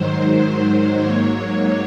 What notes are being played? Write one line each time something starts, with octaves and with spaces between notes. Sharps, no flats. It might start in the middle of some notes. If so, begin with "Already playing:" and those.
Already playing: G#2 D#3 F#3 C5
G#2 F#3 A#3 C#5